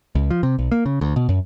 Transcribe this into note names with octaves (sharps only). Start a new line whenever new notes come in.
C#2
F3
C3
B1
A#3
C#3
D2
B2
F#2